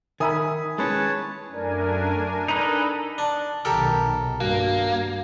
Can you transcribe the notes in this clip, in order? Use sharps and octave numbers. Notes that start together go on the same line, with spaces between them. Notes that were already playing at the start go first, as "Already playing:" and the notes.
D#3 A#4 E5 G#5 B5 D#6
G#3 C#4 E4 B4 C#5 A5
F#2 A3 D4 A#4 G#5
D#4 A4 B4 D#5
D4
B1 D#3 G4 A4 A#4
G2 A#3 F#4